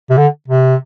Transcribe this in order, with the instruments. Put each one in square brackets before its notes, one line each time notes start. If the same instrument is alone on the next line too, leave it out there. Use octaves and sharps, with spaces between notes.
[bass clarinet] C3
D3
C3